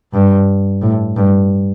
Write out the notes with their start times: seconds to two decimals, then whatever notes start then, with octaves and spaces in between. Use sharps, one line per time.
0.13 G2
0.82 A2
1.16 G2